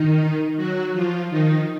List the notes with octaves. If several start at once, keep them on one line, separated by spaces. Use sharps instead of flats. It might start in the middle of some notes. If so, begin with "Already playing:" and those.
Already playing: D#3 D#4
F#3 F#4
F3 F4
D#3 D#4